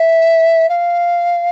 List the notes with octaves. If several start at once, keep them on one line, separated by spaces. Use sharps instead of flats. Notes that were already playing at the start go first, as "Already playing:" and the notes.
Already playing: E5
F5